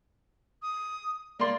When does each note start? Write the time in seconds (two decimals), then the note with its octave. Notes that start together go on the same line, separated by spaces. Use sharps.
0.62 D#6
1.39 A#3 D5 C6